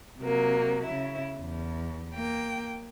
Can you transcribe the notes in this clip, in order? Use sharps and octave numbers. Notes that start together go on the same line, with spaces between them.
C3 F#3 A#3
C#3 E4
E2
A#3 G5